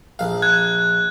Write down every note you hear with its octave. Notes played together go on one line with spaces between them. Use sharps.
A#1 F5
F#6 G#6